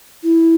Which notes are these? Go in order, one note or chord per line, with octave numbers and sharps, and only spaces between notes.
E4